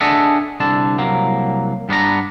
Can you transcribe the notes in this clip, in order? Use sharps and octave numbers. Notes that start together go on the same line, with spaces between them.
D4 G#4 A4 D#5 E5 F#5
C2 D3 D4 A5
C2 F#3 A#3
G2 B3 D4 A#5